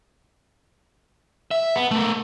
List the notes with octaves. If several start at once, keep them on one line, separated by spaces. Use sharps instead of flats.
E5
B3
A3 A#4